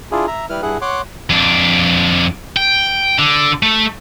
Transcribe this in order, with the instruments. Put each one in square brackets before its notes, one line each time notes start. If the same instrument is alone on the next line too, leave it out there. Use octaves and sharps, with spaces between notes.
[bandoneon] D4 E4 F4 G#4
E5 A#5
G3 E4 B4 F6
G2 E4 G#4 F#5
C#5 F#5 C6 D6
[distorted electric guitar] F2 D4
G5
D3
A3